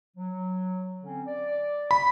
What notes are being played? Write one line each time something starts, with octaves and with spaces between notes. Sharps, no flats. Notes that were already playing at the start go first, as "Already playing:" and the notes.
F#3
D3 C4 C#4
D5
B5